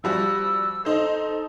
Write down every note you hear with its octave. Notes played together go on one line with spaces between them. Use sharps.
F3 G3 F#4 E6
D#4 A4 C5